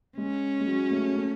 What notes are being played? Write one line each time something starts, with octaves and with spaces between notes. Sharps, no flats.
G#3 C#4
G#3
F#3
A3
A3